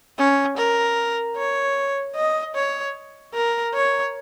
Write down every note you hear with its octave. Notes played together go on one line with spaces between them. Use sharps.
C#4
A#4
C#5
D#5
C#5
A#4
C#5